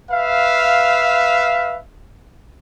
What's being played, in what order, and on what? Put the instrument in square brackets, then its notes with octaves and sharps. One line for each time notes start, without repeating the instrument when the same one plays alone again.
[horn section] B4 E5 F5